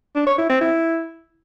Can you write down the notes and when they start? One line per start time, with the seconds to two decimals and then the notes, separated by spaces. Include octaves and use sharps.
0.15 D4
0.27 C#5
0.38 E4
0.49 C4
0.61 E4